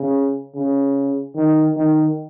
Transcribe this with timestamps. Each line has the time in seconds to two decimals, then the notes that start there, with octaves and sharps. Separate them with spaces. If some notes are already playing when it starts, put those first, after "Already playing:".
Already playing: C#3
0.55 C#3
1.36 D#3
1.76 D#3